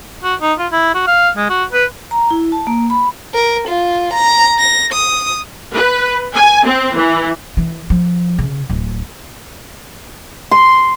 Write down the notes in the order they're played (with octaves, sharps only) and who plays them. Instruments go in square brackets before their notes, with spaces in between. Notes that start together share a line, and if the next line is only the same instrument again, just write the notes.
[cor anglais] F#4
D#4
F4
E4
F#4
F5
G#3
F#4
B4
[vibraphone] A#5
E4
A5
A#3
B5
[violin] A#4
F4
A#5
A#6
D#6
[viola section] B4
G#5
C4
E3
[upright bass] E3
F3
C#3
D1
[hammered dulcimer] C6